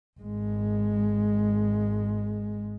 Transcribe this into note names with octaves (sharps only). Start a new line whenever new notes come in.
G#1 G#3